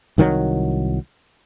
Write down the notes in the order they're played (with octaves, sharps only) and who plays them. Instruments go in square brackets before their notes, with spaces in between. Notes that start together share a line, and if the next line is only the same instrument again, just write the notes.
[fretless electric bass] C2 D#3 E3 F#3